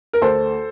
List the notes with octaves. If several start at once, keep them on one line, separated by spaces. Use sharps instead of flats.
A#4
D2 A4 C5